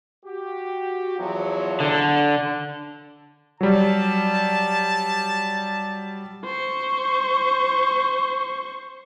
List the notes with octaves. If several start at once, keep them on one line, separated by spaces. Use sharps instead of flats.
F#4 G4
E2 F3 F#3
D3
F#3 G3 A5
C5 C#6